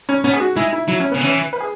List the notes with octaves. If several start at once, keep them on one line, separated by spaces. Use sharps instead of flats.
C#4
B3 C#4
G#4
F#4
G#3 E4
E4
F#3 E4
C#4
C#3 B3
E3 C#4
B4
G#4